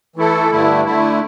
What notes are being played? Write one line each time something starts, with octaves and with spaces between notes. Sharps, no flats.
E3 A3 E4 A4
G2 D3 A3 E4
D3 A3 E4